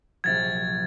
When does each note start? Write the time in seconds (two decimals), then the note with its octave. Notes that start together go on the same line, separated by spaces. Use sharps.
0.24 A#1 C3 F#3 G#6 A6